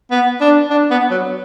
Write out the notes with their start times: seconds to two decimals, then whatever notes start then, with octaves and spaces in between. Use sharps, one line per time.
0.11 B3
0.41 D4
0.71 D4
0.91 B3
1.10 F#3